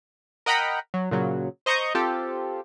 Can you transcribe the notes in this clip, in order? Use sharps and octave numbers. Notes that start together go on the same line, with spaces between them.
A#4 D#5 F#5 G5 A#5 B5
F#3
A#2 C#3 F#3
C5 D#5 A#5 C#6 D#6 G6
C4 F4 G4 A4